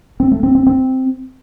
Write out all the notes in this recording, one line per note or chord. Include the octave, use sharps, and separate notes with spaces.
C4
A3
C4
C4
C4